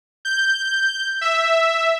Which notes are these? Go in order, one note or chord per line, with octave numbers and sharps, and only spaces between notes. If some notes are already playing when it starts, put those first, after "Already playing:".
G6
E5